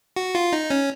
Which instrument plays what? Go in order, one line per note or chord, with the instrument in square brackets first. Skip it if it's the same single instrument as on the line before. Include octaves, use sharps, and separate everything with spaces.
[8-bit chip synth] F#4
F4
D#4
C#4